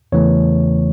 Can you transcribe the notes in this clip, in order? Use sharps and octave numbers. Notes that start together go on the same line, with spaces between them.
E2 C#3 E3 A3 C#5